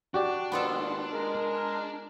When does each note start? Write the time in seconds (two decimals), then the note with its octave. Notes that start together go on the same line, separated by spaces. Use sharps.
0.14 D4 F#4 G4 D5
0.52 D#2 G#2 B3 F4 A4
1.11 G#3 A#4